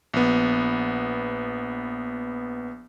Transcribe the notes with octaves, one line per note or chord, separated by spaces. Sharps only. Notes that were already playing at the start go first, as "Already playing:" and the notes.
A#1 B3